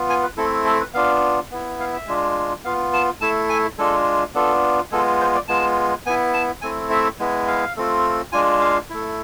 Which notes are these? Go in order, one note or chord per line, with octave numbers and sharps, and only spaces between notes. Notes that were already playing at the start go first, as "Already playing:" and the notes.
Already playing: B3 F4
G#5
B4
A3 C4 E4 A4
A4
B4
B3 D4 F4 F5
B3 E4
F5
E5
G#3 D4 F4
B3 F4 F5
A5
A3 E4 A5
G#5
G#3 D4 F4 A4
B3 D4 F4 A4
G#3 B3 F4 A4
C5
D5
G#3 B3 F4 A5
B3 E4 G#5
A5
A3 C4 E4 G#5
E5
G#3 B3 E4
F5
A3 C4 F4
G#3 D4 F4 G#5
F5
A3 E4